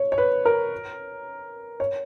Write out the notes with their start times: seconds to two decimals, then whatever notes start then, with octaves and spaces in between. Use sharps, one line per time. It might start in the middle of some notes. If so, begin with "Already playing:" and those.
Already playing: C#5
0.12 C#5
0.18 B4
0.45 A#4
1.80 C#5